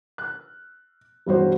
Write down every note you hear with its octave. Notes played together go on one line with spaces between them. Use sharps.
F#6
E1 G2 F#4 C5